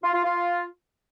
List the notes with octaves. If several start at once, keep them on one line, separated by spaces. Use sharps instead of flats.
F4
F4
F4